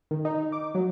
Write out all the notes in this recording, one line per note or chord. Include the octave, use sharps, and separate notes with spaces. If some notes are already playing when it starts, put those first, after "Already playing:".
D#3
D#4
D6
F#3